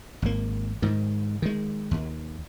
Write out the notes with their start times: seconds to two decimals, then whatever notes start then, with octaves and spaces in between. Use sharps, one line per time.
0.22 G#1 A#3
0.82 G#2 D#3
1.42 D#3 G#3
1.91 D#2